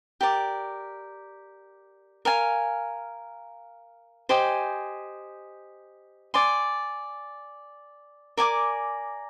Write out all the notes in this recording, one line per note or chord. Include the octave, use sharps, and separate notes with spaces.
G4 A#4 D5
A#4 F5 G#5
G4 C5 D#5 G#5
D5 G#5 C6
A#4 D5 G#5 D6